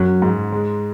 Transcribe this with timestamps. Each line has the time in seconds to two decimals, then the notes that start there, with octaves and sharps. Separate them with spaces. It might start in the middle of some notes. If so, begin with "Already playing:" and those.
Already playing: F#2 F#3 C#4
0.22 G#2
0.52 G#3